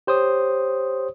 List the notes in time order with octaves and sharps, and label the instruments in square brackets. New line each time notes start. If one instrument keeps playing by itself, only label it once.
[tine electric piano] G4 C5 C#5 D#6